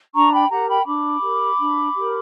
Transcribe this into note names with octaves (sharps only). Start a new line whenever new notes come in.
D4 A#5 C#6
G5 B5
G4 A#4 F#5 A#5
G5 B5
D4 B5 D6
G4 A#4
D4
G4 A#4